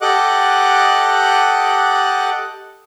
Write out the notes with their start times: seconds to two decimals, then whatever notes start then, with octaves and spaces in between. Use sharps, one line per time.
0.01 G4 A4 D#5 F#5 D6 F#6